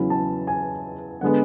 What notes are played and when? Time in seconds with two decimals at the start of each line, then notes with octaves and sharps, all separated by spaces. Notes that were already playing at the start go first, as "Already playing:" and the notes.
Already playing: E2 C#3 F#3 C#4 E4 B5
0.10 A5
0.47 G#5
1.21 D3 G#3 B3 F#5